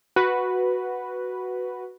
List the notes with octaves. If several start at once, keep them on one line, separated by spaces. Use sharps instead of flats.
F#4 B4